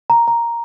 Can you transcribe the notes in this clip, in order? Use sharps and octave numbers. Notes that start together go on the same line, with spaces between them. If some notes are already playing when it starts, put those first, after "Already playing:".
A#5
A#5